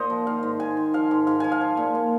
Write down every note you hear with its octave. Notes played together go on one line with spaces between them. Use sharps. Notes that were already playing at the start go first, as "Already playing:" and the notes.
Already playing: A#2 C5 D#5 F5
F3
D#3 F5
G#2
G#2 G#5
D#3
F3 F5
G#2
G#2 F5
F3 G#5
F5
F3
A#2
A#2